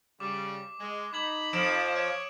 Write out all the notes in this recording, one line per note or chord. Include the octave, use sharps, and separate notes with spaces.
C#3 G3 D6
G#3
D#4 B5 D6 G#6 F#7
F2 F3 D#6 D7 E7
C#5 D7